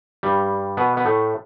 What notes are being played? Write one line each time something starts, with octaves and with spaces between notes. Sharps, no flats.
G2 G3
B2 B3
B3
A2 A3